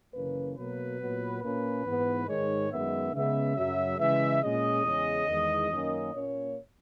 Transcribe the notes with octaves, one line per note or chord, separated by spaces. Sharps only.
F#2 C#3 E3 A#3 C#4 B4
B2 F#3 A#3 B4
A#2 F#3 B3
A#2 A#3 C#4 B4
G#2 E3 B3
G#2 D#3 G#3 C#5
F#2 D#3 G#3 B3 E5
C#3 G#3 B3 E5
F#2 C#3 F#3 E5
C#3 E3 G#3 E5
A#2 G#3 C#4 D#5
E2 C#3 G#3 C#4
E2 D#3 G#3
F#2 D#3 A#3 C#4
A#2 A#3 C#4 C#5